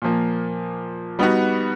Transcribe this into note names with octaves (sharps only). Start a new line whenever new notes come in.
A#2 F3 A#3
G3 B3 D#4 F#4